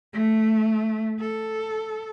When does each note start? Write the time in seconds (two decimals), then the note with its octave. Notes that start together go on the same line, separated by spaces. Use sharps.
0.13 A3
1.20 A4